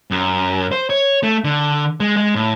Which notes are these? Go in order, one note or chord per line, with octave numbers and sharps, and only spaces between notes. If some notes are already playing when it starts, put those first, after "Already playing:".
F#2
C5
C#5
A3
D3
G#3
G#3
A2